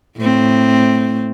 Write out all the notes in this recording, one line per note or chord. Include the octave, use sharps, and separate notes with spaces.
A2 C4